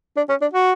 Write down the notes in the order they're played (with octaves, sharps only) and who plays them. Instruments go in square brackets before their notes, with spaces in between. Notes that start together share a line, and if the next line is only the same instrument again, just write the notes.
[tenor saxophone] D4
C#4
D4
F#4